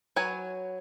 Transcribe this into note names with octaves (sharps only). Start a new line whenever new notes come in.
F#3 B4 C#5 G#5